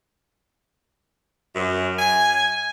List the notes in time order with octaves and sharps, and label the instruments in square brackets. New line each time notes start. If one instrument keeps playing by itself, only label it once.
[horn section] F#2
G#5